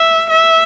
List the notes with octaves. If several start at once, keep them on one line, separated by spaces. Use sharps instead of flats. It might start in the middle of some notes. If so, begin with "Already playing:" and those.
Already playing: E5
E5